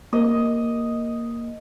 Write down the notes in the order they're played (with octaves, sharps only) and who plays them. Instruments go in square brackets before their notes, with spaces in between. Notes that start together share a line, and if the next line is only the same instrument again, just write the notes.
[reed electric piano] A#3 [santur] D#5